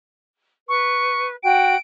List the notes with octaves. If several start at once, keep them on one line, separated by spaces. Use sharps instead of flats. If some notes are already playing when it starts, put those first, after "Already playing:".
B4 C#6
F#4 G5 D7